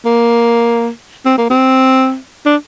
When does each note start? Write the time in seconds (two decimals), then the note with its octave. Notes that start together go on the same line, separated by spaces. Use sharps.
0.05 A#3
1.26 C4
1.38 A#3
1.50 C4
2.46 D4